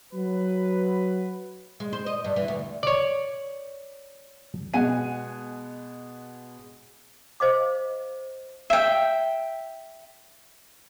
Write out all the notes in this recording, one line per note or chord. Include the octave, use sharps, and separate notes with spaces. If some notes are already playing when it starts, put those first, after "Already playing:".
F#3 B4
G#3
C5
D#5
G2
E3
D2
C#5 D5
B2 G#3 F#5 G#5 D#7
C5 D#5 F5 D6
E5 G5